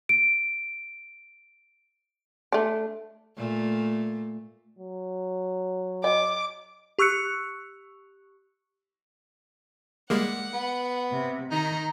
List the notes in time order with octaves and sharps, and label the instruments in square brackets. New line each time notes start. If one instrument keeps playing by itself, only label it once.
[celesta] D7
[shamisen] A3 D4
[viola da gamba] A#2 A3
[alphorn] F#3
[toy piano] D#5 [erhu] D6
[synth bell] G4 C#6 E6 F#6 C#7
[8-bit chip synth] G3 G#3 A#3 [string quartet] F#5
[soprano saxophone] B3
[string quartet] C3
[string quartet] D#3 A#5 [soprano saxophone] D#4